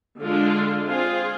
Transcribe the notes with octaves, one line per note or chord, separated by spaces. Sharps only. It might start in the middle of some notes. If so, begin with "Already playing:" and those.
D3 G#3 D4 F4
C4 F4 G#4